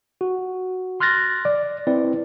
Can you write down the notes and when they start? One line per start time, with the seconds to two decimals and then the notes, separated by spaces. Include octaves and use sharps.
0.21 F#4
1.00 C6 F6 F#6 A6 A#6
1.45 D5
1.87 C4 E4 B4 D5